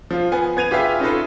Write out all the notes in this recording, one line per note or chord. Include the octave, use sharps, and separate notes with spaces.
F3 F4
B3 G#5
B3 G#6 D#7 F7
F4 G4 G#4 B4 E5
C#4 D#4 F4 A4 B4